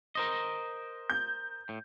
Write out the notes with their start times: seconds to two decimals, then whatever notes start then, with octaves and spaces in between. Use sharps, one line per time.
0.15 A#4 C5 D#5
1.10 G6
1.69 A2